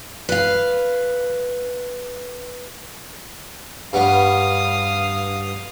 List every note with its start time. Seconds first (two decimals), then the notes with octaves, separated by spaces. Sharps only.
0.29 B4 F5
3.93 G2 B3 C#5 F5 D#6